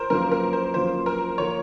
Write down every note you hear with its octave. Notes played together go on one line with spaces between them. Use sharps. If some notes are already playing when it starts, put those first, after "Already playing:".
Already playing: A#4 C5
F#2 F3 A#3 A#4
A#4
C5
F#2 F3 A#3 C5
A#4
F3 A#3 C#5